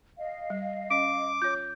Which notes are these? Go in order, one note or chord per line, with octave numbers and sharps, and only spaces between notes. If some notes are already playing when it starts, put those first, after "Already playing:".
D#5 F5
G3
C#4 D6 D7
F4 C#5 G6